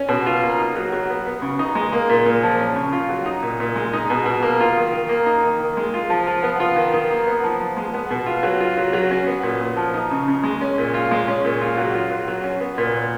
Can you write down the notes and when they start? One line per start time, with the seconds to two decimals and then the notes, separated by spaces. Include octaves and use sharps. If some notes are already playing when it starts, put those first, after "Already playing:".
Already playing: C#4
0.09 B2
0.26 F4
0.43 A#3
0.58 D#4
0.75 F#3
0.92 F#3
1.10 B3
1.26 B3
1.42 C#3
1.59 D#4
1.75 G#3
1.93 A#3
2.09 A#2
2.26 A#2
2.43 F3
2.60 C#4
2.76 C#3
2.93 F4
3.09 F#3
3.26 D#4
3.42 A#2
3.60 A#2
3.76 G#3
3.93 D#4
4.10 B2
4.26 B2
4.42 A#3
4.60 F4
4.77 D#3
4.93 D#3
5.09 A#3
5.26 D#4
5.43 D#3
5.60 D#3
5.77 G#3
5.94 F4
6.10 F3
6.27 F3
6.43 B3
6.60 F4
6.76 D#3
6.93 D#3
7.11 A#3
7.27 B3
7.44 F3
7.60 F3
7.77 G#3
7.94 B3
8.11 B2
8.26 F4
8.43 F#3
8.61 F4
8.77 F#3
8.93 F#3
9.11 C#4
9.27 B3
9.43 A#2
9.61 A#2
9.77 F3
9.94 D#4
10.11 C#3
10.28 C#3
10.43 G#3
10.61 C#4
10.78 A#2
10.94 F4
11.11 G#3
11.28 C#4
11.45 A#2
11.61 F4
11.77 F#3
11.95 F4
12.11 F#3
12.28 F#3
12.44 C#4
12.60 B3
12.78 A#2
12.94 A#2